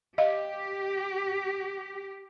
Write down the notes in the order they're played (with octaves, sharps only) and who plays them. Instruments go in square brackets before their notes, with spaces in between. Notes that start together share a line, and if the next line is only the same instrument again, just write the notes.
[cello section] G4 [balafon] D#5 F5